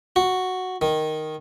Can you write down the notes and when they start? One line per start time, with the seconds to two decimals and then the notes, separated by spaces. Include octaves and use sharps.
0.16 F#4
0.81 D#3